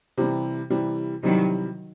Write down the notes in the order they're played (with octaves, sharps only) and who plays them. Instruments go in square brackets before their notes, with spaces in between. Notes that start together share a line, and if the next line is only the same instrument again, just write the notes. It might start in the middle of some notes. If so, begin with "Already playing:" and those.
[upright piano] C3 E3 G3
C3 E3 G3
[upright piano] C3 E3 G3 [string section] D#3 F#3